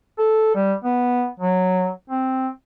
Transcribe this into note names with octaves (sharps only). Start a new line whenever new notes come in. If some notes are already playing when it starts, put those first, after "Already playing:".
A4
G3
B3
F#3
C4